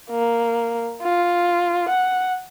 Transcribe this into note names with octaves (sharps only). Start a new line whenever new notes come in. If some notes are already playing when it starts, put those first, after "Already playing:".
A#3
F4
F#5